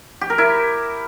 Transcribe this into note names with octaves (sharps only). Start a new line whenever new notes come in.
G4
A#4
E4